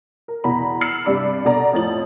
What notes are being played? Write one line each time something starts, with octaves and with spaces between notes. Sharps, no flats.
A#4
E2 B2 A#5 B5
E6 F6 C7 C#7 F#7
G2 C3 D5 B5
B2 D4 A4 D5 A#5
F2 A2 A6 F#7